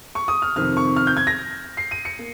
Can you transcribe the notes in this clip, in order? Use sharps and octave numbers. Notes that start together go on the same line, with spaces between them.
C#6
D#6
F6
F2 C3 D#3 F6
C#6
F6
G6
G#6
A#6
C7
D#7
C#7
A#3